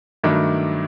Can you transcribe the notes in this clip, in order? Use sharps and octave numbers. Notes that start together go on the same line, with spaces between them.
G2 D#3 F#3 A3 D4